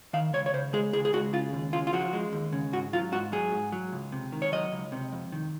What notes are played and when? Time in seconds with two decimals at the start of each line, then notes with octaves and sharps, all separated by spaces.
0.13 D#3 F5
0.33 C#2 C#5
0.46 C#5
0.53 C#3 C5
0.73 G#3 G#4
0.93 C#2 G#4
1.05 G#4
1.13 C#2 F#4
1.33 C#3 F4
1.53 D#2
1.73 C#3 F4
1.87 F4
1.93 F3 F#4
2.13 G#3
2.33 D#2
2.53 C#3
2.73 G#2 F#4
2.93 F#3 F4
3.13 G#2 F#4
3.32 F#3 G#4
3.52 G#2
3.72 F#3
3.92 C#2
4.12 C3
4.32 D#3
4.42 C#5
4.52 F#3 D#5
4.72 C#2
4.92 C3
5.13 F2
5.32 D#3